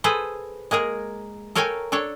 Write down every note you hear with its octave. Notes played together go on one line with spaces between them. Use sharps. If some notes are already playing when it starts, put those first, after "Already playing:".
G#4 A4 B4 C5
G#3 A#3 G#4 A#4
A4 A#4 C#5 F5 G5 G#5
D4 A4 C#5